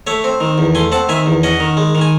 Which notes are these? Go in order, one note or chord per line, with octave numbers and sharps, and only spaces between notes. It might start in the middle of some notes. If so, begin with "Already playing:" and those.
A3 C#5 E5
C4
D#3
E2
A3 G#5 C6
C4 F#5 A5
D#3 E5 G#5
E2
C#4 D#5 F#5
D#3
G#3
D#3
G#5